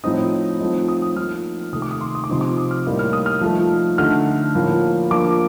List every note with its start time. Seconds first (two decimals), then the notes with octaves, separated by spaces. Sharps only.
0.04 A2 F3 C4 D#4 D#6
0.60 F3 A3 C4 D#4
0.88 D#6
1.02 D#6
1.16 F3 A#3 D#4 F6
1.73 C3 D#3 A3 D#6
1.82 D6
1.91 D#6
2.01 C6
2.15 D#6
2.24 D6
2.29 C3 F3 C4 D#4 C6
2.41 D6
2.57 D#6
2.71 F6
2.86 A2 G3 A#3 D#4
2.99 F6
3.13 D#6
3.26 F6
3.41 F3 A3 D#4
3.98 D3 A3 D#4 F6
4.55 A2 F3 A#3
5.11 F3 A#3 D4 D6